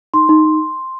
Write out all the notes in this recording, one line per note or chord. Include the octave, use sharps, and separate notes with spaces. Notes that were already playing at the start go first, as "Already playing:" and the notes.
D#4 C6
D#4
D#4